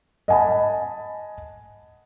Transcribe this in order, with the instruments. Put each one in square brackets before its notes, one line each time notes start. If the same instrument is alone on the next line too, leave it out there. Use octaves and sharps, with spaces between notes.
[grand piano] D#5 F#5 G#5 A5 B5